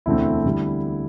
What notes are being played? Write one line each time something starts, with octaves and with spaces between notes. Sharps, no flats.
E1 D2 D3 A3 C4 E4
D3 G3